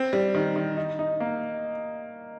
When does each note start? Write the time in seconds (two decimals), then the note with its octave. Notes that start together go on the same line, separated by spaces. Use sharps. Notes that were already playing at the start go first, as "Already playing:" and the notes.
Already playing: C4
0.13 G3
0.35 D#3
0.56 D#3
0.77 D#4
0.99 D#4
1.20 A#3